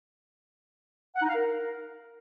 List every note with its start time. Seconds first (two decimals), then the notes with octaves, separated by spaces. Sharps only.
1.15 F#5
1.22 D#4
1.29 F5
1.35 A#4